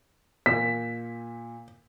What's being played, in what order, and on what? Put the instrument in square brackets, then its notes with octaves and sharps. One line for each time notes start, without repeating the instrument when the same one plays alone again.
[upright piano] A#2 E7 [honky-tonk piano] B6